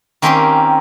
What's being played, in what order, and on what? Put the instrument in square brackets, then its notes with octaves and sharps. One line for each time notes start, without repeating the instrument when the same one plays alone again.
[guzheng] D#3 A#3 C4 C#4 G4 C6